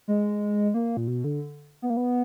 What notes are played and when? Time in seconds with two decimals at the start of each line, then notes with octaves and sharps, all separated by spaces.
0.08 G#3
0.74 A#3
0.97 A#2
1.08 B2
1.24 D3
1.82 B3
1.90 A#3
1.97 B3